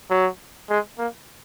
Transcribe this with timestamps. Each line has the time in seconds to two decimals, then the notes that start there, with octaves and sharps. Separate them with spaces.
0.10 F#3
0.70 G#3
0.98 A#3